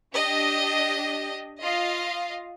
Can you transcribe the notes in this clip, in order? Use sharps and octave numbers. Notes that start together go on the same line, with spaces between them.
D4 G4 D#5
F4 D#5 F5